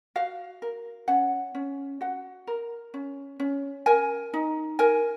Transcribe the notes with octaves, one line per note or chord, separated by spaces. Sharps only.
F#4 F5
A#4
C#4 F#5
C#4
F#4 F#5
A#4
C#4
C#4
A#4 G#5
D#4
A#4 G#5